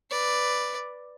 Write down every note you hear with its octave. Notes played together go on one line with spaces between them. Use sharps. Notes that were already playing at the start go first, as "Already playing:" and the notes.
B4 D5